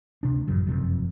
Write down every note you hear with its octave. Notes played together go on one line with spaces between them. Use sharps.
D2 C3 D4
A1 F#2 C#3 F#3
F#1 F2 C3 F3